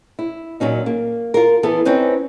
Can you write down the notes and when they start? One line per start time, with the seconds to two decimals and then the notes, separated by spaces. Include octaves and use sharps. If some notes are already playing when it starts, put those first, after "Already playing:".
0.19 E4
0.60 A#2 F#3 C#4 D#4
0.86 A#3
1.34 F4 A#4
1.63 E3 B3 E4 A4
1.85 C4 C#4 D#4 B4 C5